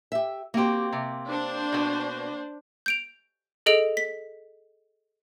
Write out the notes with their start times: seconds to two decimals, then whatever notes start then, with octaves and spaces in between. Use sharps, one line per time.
0.12 G4 E5
0.54 A#3 C4 F#4 G4
0.93 C3
1.29 D4 C5
1.72 B2 B3
2.86 G6 D7 F7
3.66 G#4 A4 D#5 D7 F7
3.97 B6